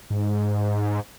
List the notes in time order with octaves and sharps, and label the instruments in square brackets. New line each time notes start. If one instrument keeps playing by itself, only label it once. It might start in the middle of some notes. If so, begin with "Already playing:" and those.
[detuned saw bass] G#2